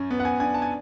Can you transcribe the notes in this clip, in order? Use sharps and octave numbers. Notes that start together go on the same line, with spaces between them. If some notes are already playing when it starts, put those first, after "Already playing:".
Already playing: F#2 C#4
B3
F#5
G#5
D4 G#5
A5
G#5